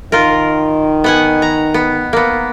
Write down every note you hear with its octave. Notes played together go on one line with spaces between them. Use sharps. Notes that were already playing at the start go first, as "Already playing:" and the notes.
D#3 F4 A#4
B3 F#5 G#5
A#5
B3
A#3 B3